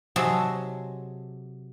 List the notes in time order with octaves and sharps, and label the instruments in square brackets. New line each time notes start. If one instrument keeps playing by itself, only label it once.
[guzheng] C3 F#3 G#4 C#5 D#5 A5